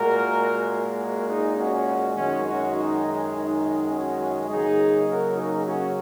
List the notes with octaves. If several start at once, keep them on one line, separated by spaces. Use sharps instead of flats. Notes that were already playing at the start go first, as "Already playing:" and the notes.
Already playing: A#2 G#3 F#4 A#4
F#4 A#4
D#4 G#4
C#4 F#4
F#2 D#3 G#3 C#4 F#4
C#4 F#4
D#4
D#4
C#4 F#4
C#3 F#3 A#3 D#4 G#4
F#4 A#4
D#4 G#4
C#4 F#4